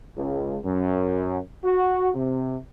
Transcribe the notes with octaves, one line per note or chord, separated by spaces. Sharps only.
C#2
F#2
F#4
C3